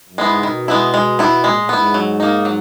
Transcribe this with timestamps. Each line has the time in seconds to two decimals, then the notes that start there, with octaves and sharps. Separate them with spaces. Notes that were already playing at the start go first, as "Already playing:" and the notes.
0.08 F#2
0.17 G#2 G#3 B3 E4
0.33 C#3
0.43 B2 D#3
0.68 G#3 B3 E4
0.94 G#3
1.19 B3 E4
1.44 A#2 G#3
1.58 A#2
1.69 G#2 B3 E4
1.94 F#3
2.20 A#3 D#4
2.45 F#3